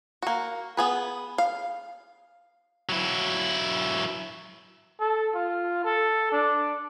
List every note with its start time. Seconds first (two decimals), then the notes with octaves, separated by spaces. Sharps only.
0.22 A#3 F#4
0.77 B3 G#4 B4
1.38 F5
2.89 F#3 E4
5.00 A4
5.35 F4
5.84 A4
6.32 D4